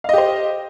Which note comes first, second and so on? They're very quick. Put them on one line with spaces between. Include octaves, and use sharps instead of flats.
F5 D#5 G4 C5